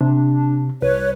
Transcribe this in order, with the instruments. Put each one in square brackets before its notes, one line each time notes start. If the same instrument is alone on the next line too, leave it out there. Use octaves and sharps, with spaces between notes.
[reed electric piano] C3 [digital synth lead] D4
[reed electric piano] C2 [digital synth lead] B4 [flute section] C#5